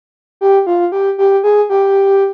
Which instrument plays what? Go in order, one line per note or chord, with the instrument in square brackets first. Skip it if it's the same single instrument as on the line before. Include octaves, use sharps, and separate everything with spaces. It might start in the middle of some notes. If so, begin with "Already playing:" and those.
[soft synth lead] G4
F4
G4
G4
G#4
G4